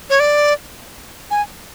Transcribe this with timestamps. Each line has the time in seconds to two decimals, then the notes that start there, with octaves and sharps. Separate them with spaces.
0.10 C#5
0.20 D5
1.31 G#5